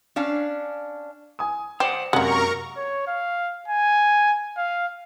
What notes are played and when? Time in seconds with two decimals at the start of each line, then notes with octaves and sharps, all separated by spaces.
0.16 C#4 D4 F5
1.39 G#5 D#6
1.80 G4 C5 D5 F#5
2.13 F#2 C3 G#3 A#3 A#4 F#5 A#5 C#6
2.77 C#5
3.07 F5
3.68 G#5
4.57 F5